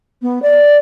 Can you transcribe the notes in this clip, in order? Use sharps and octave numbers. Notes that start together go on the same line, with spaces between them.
B3
D5